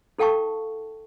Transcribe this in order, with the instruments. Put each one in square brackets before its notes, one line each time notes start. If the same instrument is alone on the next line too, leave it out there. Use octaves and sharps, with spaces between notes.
[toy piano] D#4 A4 F5 G5 A5 C#6